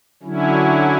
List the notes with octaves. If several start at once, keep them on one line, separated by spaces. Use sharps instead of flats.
D3 F#3 C#4 E4